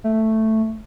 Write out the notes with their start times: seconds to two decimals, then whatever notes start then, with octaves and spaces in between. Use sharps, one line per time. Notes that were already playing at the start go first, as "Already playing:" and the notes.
0.04 A3